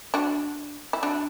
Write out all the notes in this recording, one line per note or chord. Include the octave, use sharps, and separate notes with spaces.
D4 F#4
E4
D4 F#4